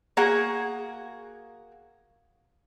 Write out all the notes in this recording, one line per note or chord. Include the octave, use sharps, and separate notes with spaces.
A#3 F#4 G#4 F#5